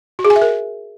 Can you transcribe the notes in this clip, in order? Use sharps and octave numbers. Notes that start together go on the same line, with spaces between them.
F#4
G#4
G#5
E5
A#4